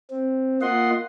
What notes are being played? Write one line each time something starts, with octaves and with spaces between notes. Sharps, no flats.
C4
A#3 F4 D#5 F#5 C6